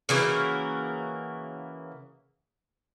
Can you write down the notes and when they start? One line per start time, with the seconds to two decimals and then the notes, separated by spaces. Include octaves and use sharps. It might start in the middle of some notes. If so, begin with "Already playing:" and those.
0.09 C#3 E3 A#3 F#4